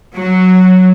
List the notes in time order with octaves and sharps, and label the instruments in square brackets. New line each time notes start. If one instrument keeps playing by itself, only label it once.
[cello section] F#3